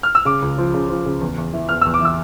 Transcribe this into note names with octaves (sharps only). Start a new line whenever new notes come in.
F6
E6
C#3 D6
C#2
F3
C#3
F3
C#3
E2
E2
E3
E2 F6
E6
E2
D6
E3 E6